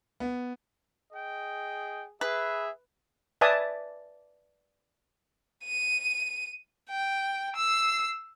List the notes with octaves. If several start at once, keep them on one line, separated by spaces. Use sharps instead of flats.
B3
G#4 D#5 G5
G#4 B4 E5
B4 D5 E5 G#5 A5 D#6
D#7
G5
E6 C7